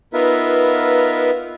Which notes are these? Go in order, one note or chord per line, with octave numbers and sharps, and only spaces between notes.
B3 D#4 F4 A#4 B4 E5